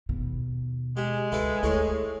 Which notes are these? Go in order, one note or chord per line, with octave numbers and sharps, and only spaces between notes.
D#2 B2
G#3 G4
C#2 E4 A4 B4
D2 A2 G#4 C#5